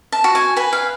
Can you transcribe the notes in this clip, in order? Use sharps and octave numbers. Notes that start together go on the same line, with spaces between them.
A5
F#4
G#5
B4 G#5
F5